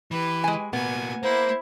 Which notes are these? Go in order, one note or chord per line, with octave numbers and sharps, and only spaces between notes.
E3 G4 B4
G#3 G#5
B2 A#3 B3 G#5
A#3 E4 C5